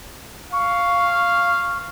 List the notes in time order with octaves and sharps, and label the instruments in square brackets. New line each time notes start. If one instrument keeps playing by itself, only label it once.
[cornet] F5 [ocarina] C#6